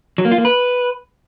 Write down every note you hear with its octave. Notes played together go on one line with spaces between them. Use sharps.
F#3
A#3
F4
A#3
B4